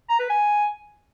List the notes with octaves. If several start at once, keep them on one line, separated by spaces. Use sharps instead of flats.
A#5
B4
G#5